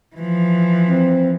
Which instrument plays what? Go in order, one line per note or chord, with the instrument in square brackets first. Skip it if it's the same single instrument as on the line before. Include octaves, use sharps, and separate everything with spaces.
[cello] E3 F3
[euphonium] C4